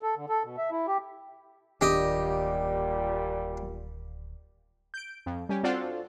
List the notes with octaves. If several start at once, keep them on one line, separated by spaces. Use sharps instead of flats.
A4
D3
A4
B2
E5
E4
G4
D1 A#2 D#3 G3 D4 G4 D#5
G6 D7
F2
G3 C#4 G4
C4 D4 F4 F#4 A4 C5